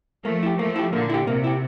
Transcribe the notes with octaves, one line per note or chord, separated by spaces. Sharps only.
F3 A3 A#3
E4 G4
F3 A3 A#3
E4 G4
A#2 D3 A#3
E4 G4
C3 A#3
E4 G4